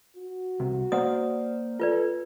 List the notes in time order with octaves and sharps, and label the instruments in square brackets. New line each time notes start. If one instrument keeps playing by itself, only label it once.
[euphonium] F#4
[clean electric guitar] C2
[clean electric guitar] A#3 C5 D5 [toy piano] F#5 D#6
[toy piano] F4 B4 D5 [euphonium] A4